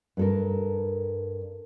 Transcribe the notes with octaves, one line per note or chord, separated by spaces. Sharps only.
G2 A4 A#4